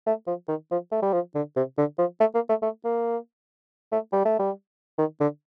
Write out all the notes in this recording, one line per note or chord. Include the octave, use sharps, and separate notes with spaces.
A3
F3
D#3
F3
A3
G3
F3
D3
C3
D3
F3
A3
A#3
A3
A3
A#3
A3
G3
A3
G3
D#3
D3